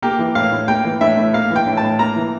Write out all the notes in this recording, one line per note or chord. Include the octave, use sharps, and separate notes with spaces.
A#3 G4
E3
A2 F5
A2
A#3 G5
E3
A2 E5
A2
A#3 F5
E3
G5
A2
A5
A2
A#3 A#5
E3